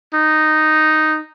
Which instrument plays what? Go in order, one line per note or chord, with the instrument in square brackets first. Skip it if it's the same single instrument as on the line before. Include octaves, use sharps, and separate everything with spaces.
[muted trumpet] D#4